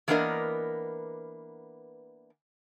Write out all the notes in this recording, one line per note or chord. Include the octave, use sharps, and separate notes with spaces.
E3 A#3 B3 D4 A#4 D#5